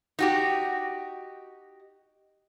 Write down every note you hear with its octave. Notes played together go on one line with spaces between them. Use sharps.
D#4 F#4 G4